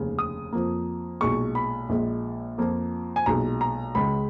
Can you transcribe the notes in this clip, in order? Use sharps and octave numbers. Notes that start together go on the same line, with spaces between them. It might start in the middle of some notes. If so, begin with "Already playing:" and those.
Already playing: F1 D#2 C#3
D#6
F2 F3 A#3
B1 A#2 G#3 C#6
B5
A#1 A#2 G#3
F2 F3 A#3
G#5
B1 A#2 G#3 A#5
A#5
C#2 C#3 G#3 B5